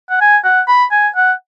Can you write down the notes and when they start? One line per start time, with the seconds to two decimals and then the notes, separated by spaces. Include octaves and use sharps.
0.10 F#5
0.21 G#5
0.44 F#5
0.68 B5
0.91 G#5
1.16 F#5